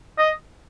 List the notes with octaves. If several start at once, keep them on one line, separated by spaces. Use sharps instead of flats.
D#5